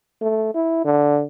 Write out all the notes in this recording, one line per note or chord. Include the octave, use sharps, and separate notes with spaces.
A3
E4
D3